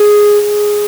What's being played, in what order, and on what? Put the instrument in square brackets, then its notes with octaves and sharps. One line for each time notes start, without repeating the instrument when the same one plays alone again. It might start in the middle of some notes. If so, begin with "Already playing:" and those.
Already playing: [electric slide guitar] G#4